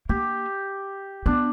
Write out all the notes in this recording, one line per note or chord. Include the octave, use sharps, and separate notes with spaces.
A#3 G4
B3 D4